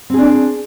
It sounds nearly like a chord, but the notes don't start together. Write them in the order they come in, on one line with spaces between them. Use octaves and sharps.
C4 G#4 D4